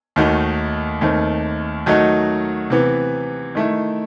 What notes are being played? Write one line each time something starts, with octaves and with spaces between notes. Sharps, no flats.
D#2 D#3 A3 D#4 F#4
D#2 D#3 A3 C4
D#3 F#3 A3 D#4 F#4
C3 E3 B3
D#3 A3 E4